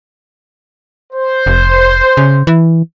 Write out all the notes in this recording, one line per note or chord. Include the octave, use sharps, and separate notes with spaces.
C5
F1
C#3
E3